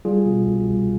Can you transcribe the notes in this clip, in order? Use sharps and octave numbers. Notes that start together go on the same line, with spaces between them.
G3 F4 G#4
B2
C2
C2